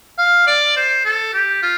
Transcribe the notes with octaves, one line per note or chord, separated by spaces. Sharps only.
F5
D5
C5
A4
G4
F4